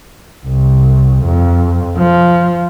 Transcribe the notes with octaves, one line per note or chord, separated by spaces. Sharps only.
C2
F2
F3